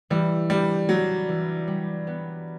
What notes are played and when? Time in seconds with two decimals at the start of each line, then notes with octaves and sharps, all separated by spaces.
0.10 E3 G3
0.50 G3 D4
0.89 F#3 D4
1.29 E3
1.68 G3
2.07 B3